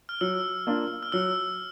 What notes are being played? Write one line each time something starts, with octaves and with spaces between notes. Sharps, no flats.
F6
F#3 E6
A#3 D4 F4
F6
F#3 E6